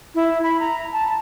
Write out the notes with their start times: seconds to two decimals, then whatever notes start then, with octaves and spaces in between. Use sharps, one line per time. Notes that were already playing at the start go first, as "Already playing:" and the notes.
0.15 E4
0.43 B5
0.60 A#5
0.93 A5